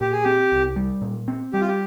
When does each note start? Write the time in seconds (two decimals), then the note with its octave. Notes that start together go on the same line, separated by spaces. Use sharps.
0.01 A#2 G4
0.12 G#4
0.24 C4 G4
0.52 C2
0.76 G3
1.02 A#2
1.28 C4
1.53 G3 G4
1.61 F4
1.68 G4